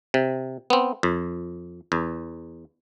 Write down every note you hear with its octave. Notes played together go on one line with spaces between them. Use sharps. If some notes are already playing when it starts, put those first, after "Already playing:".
C3
B3 C4
F2
E2